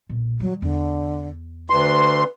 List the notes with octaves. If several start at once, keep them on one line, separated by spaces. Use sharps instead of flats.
B1 A#2
D#3 F#3 G3
E2 D3
D2 B4 C6